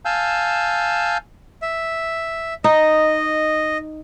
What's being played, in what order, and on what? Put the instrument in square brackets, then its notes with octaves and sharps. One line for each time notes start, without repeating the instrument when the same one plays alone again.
[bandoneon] F5 G#5 A5 E6 G6
[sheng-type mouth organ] E5
[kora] D#4 [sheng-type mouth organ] D#5